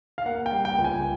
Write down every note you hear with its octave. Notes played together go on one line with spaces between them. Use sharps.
F5
A#3 F#5
G5
G3
G5
C#2
G#5